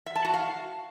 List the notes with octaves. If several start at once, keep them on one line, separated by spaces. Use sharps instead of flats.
E5
A5
F#4
F5